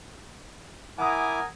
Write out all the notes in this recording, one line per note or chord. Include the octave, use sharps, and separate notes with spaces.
E4 A#4 F#5 G#5 D6 D#6